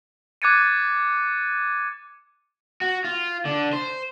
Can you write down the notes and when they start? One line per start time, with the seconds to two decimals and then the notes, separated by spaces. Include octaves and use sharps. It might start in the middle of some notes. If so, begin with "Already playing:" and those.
0.42 D6 F#6 G#6 A6 C#7 D#7
2.81 F#4
3.04 F4
3.45 D3
3.73 C5